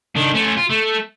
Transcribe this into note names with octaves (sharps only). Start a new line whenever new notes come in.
D#3 D4
A3 C#4
F4
A3